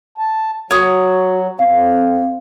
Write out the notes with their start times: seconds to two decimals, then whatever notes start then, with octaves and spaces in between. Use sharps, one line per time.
0.18 A5
0.71 F#3 F#4 C#5 D#6
1.59 F2 C4 F5